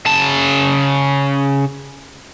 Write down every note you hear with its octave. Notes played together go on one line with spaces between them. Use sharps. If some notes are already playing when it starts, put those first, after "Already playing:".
C#3 A5